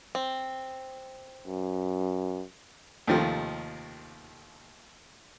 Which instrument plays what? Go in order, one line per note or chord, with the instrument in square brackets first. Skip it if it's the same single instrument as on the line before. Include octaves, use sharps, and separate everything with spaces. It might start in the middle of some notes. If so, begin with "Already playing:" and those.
[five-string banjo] C4
[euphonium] F#2
[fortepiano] D#2 C3 D#3 F3 A3